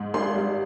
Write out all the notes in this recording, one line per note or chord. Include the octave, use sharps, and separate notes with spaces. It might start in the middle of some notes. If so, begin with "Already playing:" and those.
Already playing: G#2
G#1 C6
G3